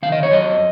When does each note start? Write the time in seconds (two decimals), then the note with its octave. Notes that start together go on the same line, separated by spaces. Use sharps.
0.03 D#3 F5
0.12 D#5
0.23 C#5
0.30 F#2 D#5